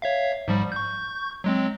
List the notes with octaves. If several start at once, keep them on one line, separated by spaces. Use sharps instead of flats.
C#5 E5 F5
G#2 F3 G3
C#6 G6
F#3 G#3 C4